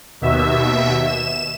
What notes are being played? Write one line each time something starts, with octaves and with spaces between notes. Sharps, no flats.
D#2 B2 E5
E7